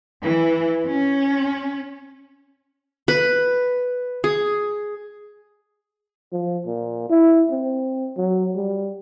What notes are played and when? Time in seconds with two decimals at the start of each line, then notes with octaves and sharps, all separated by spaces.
0.23 E3
0.87 C#4
3.08 B4
4.24 G#4
6.33 F3
6.66 A#2
7.10 E4
7.51 C4
8.17 F#3
8.56 G3